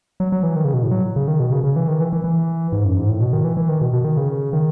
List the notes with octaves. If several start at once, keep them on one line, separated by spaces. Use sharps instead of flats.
F#3
F#3
E3
D#3
C#3
B2
A2
F#3
C#3
D#3
B2
C#3
C#3
E3
D#3
E3
E3
E3
G#2
F#2
G#2
A2
B2
D#3
E3
E3
D#3
B2
B2
D#3
C#3
D#3